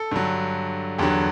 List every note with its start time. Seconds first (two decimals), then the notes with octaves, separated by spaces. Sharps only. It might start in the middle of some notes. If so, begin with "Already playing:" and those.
Already playing: A4
0.12 G2 D3 F#3
0.98 E2 D3 F#3 G4